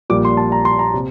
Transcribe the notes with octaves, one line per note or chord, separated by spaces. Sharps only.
A#1 A#2 G3 D6
C6
A5
A#5
C6
A#5
C3